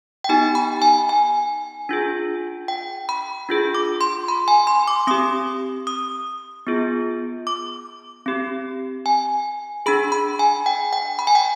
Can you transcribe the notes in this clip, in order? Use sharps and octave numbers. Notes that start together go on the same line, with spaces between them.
G5
B3 D#4 G4 G#5
B5
G#5
G#5
D4 F4 G#4
G5
B5
D4 F4 G#4
D6
C6
B5
G#5
C6
D6
C4 G4 D#6
D#6
B3 F4 G#4
D6
C4 G4
G#5
D4 G#4 B5
B5
G#5
G5
G5
B5
G#5
G5